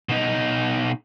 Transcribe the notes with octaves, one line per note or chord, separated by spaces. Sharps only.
B2 D#4